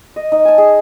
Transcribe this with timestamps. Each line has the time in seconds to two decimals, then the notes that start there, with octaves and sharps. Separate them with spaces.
0.16 D#5
0.32 D#4
0.45 G#5 A5
0.58 G#4